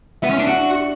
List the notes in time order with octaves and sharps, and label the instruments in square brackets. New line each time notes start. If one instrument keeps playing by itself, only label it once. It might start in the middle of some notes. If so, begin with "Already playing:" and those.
[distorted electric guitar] B3 [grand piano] E4
[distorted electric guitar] C#4
D4
F#4
[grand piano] D4